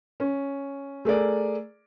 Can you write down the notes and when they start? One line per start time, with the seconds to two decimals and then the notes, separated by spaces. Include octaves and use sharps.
0.20 C#4
1.05 A3 G#4 A#4 D5